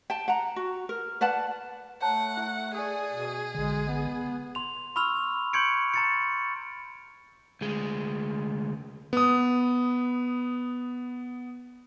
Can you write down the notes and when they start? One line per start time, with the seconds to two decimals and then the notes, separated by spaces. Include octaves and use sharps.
0.10 G5 A5
0.28 F#5 A#5
0.56 F#4
0.89 A#4
1.21 B4 D5 F#5 A5
2.02 A3 C#5 F#5 A5 A#5
2.37 E4 E5
2.75 G#4 D5 G#5 D#6
3.11 B2
3.55 A1 D3 G#3
3.88 B3
4.55 C6 F7
4.96 B5 C#6 E6 F6 F7
5.53 C6 C#6 G6 G#6 C#7 D7
5.94 A#5 A6 C#7
7.61 D2 G#3
9.13 B3 D#6